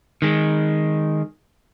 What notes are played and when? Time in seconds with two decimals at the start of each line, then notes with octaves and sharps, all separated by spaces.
0.22 D#3 G#3